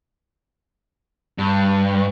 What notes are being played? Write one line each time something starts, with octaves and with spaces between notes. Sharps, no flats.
G2